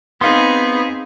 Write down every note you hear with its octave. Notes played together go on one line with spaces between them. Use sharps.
B3 C4 D#4 G#4 F5 C6